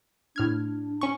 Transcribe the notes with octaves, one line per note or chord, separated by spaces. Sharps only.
A2 D4 F6 G#6
C#4 C#6